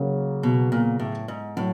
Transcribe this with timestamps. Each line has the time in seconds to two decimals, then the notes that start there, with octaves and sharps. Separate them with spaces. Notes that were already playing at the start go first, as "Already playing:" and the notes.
Already playing: C#3 F#3 A#3
0.43 B2
0.72 A#2
0.99 A2
1.28 G#2
1.56 A2 F#3